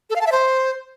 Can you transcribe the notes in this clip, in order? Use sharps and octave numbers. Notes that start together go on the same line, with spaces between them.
A4
F5
A5
E5
C5